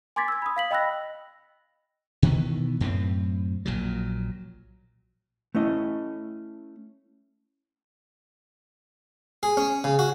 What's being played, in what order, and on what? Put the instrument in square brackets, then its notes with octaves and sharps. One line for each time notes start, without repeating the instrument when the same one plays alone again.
[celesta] G#5 C6 D6 G#6 A6 B6
E6 G#6
B5 D#6
F5 B6 F#7
D#5 G5 B5 E6 F#6 A#6
[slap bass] B2 D#3 E3 B3
F#2 A2 B3 C4
A#1 A#2 F#3
[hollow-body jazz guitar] A3 C#4 E4 D#5
[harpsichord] G#4
C#4
C#3
F#4